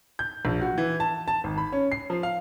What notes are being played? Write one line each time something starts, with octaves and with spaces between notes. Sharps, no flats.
G6
A#1
F#4
E3
A5
A5
G#1
B5
C#4
C7
F3
F5